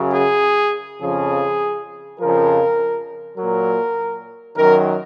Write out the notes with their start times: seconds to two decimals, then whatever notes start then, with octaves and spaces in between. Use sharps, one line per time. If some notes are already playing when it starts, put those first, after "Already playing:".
Already playing: F#2 C#3 F#3
0.14 G#4
1.02 F2 C#3 F3 G#4
2.20 F2 C#3 F3 A#4
3.38 A#2 F#3 A#4
4.55 F#2 D#3 F#3 A#4